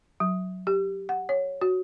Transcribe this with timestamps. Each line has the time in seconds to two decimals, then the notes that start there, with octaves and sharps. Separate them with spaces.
0.20 F#3
0.67 G4
1.09 F#5
1.29 C#5
1.61 F#4